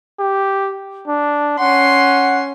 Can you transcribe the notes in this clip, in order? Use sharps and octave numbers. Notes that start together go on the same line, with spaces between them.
G4
D4
C#4 F#5 C6